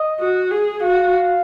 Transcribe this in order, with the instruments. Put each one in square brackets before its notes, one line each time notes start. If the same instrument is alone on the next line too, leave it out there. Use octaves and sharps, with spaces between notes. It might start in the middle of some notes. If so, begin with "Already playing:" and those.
Already playing: [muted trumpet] D#5
[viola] F#4
G#4
[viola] F#4 [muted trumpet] F5